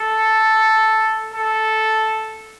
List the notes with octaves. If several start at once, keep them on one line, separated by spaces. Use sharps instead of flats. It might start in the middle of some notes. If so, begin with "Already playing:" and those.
Already playing: A4
A4